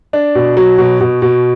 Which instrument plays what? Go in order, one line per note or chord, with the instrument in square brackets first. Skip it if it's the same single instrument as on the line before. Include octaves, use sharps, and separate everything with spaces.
[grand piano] D4
B2
F#3
B2
B2
B2